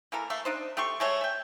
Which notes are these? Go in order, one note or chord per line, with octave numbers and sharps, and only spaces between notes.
E3 A#3 A4 A#4
A3 E5 F5
D4 D#4 C5
A3 G4 C6 C#6
G#3 A3 C#5
E5 G5